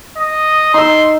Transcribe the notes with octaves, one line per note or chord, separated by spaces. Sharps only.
D#5
D#4 C6 E6